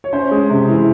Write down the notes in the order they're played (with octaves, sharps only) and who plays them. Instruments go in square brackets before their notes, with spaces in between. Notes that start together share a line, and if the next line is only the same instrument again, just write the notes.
[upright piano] C#5
C#4 C5
G#3
C3
E3